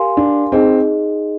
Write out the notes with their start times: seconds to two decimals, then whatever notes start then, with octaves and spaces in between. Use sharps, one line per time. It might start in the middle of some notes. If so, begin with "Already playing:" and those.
Already playing: G4 A#4 F5 G#5 C6
0.17 D4
0.52 C4 D#4 G#4 D#5